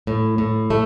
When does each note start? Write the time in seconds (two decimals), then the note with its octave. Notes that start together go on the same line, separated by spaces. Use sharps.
0.07 A2
0.38 A2
0.70 A3